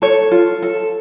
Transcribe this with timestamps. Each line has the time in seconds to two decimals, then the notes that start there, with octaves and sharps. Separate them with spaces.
0.02 A4 C#5
0.31 F4
0.63 A4